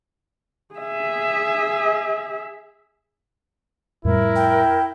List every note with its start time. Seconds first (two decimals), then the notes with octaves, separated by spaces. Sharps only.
0.75 G#4 E5
4.05 F2 A2 G3 E4 A#4
4.36 G5